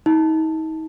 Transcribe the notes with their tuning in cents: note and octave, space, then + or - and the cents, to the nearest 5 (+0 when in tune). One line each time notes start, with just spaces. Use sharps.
D#4 +35